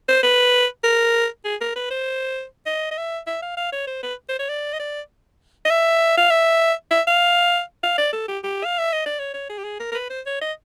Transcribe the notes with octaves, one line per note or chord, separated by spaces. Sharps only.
C5
B4
A#4
G#4
A#4
B4
C5
D#5
D#5
E5
E5
F5
F5
C#5
C5
B4
C5
C#5
D5
D#5
D5
D#5
E5
F5
E5
E5
F5
F5
D5
A4
G4
G4
F5
E5
D#5
D5
C#5
C#5
G#4
G4
G#4
A#4
A#4
B4
C5
C#5
D#5